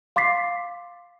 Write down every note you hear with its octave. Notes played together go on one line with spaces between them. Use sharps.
F5 C6 D6 A6 B6 C7